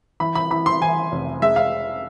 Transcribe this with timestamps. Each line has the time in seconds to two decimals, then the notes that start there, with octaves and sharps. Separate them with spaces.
0.20 E3 B5
0.35 B5
0.50 E3 B5
0.66 C6
0.81 E3 G#5
1.12 F1
1.42 G#3 E5
1.56 F5